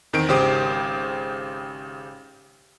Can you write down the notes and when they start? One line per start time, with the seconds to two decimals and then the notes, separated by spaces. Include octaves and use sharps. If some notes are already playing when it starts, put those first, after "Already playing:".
0.13 E2 D#3 C4 D7
0.28 G#1 C#3 G4 C5 G5 D#6